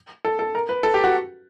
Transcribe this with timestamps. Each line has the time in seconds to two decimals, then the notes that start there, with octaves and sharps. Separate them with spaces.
0.25 A4
0.39 A4
0.55 A#4
0.69 B4
0.83 A4
0.94 G4
1.04 F#4